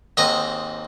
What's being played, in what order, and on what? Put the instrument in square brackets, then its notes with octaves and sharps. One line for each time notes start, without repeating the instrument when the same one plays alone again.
[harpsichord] D#2 G#2 C4 D#5 A#5